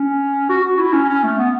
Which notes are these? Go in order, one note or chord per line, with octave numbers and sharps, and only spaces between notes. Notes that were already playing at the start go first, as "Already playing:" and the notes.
Already playing: C#4
F#4
F#4
E4
C#4
C#4
A3
B3